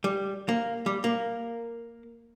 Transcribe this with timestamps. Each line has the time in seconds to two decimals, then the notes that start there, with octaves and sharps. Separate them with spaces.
0.04 G3
0.49 A#3
0.86 G3
1.04 A#3